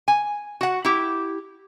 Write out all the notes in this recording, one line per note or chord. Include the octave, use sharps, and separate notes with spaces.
G#5
F#4 F#5
E4 G4